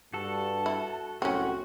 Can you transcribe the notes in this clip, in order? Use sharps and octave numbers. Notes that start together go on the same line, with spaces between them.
G2 F#4 A4 A5
E4
C2 F#2 A2 C4 C#4 F#4 F#5